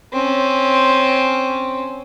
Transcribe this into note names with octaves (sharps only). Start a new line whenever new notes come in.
C4 C#4